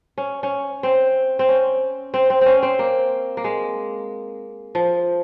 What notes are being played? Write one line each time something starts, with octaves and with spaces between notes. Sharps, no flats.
C#4
C#4
C4
C4
C#4
C4
C4
C4 C#4
C4
A#3
A#3
G#3
F3